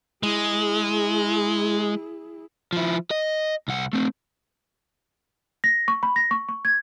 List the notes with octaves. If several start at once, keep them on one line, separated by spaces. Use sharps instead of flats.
G#3 E4 G#4
F3 E4
D#5
C2 F#5
A3 C4
A#6
C#6
B5
A#6
C#6
C#6
G#6